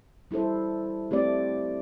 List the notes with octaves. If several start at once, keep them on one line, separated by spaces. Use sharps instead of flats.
G3 E4 A4 C5
A3 C4 G4 D5